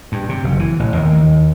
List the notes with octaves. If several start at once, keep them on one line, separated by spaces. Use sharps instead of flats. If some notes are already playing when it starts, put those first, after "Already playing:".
G2
C3
F#1
E3
A1
D#2